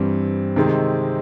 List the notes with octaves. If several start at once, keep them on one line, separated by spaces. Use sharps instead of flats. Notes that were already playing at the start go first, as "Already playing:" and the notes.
Already playing: G2 E3 G3 C4
C3 D#3 G#3 C4 D#4